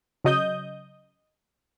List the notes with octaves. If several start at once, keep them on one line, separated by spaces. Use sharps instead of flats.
C#3 F#3 D#5 D#6 G6